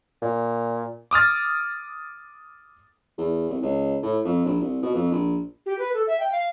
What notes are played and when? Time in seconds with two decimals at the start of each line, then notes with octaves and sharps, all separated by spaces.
0.22 A#2
1.11 D6 D#6 F6 A6
3.18 E2
3.49 C2
3.62 C#2
4.02 A2
4.25 F2
4.45 A#1
4.61 C2
4.83 B2
4.94 F2
5.12 A#1
5.66 G4
5.79 B4
5.94 A4
6.07 E5
6.20 G5
6.32 F5